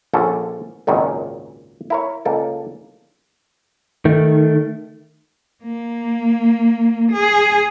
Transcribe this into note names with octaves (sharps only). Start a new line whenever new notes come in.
A#1 D3 C#4 A4
G#1 C#2 F#2 A#2 D#3
E4 A#4 C#5
C#2 A#3 A4 D5
D#3 A3
A#3
G#4